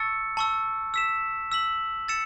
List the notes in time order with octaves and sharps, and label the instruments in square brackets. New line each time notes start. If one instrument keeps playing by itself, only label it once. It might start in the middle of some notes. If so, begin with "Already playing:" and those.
Already playing: [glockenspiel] A5 C#6 E6 A6 C#7
A5 C#6 E6
E6 B6 E7
E6 B6 F#7
E6 A6 C#7 E7